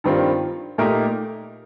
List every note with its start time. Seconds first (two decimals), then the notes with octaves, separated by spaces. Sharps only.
0.04 G2 D#3 G3 C4 F4
0.78 A#2 A3 D#4 G4 A#4